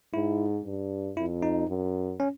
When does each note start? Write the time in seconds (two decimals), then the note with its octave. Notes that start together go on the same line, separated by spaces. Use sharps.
0.14 G#2 E4
0.65 G2
1.17 F2 E4
1.42 D#4
1.68 F#2
2.20 C#4